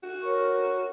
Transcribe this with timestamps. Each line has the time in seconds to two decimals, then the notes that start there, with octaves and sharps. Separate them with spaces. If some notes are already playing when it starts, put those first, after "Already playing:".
0.03 F#4
0.21 A#4 C#5 C#6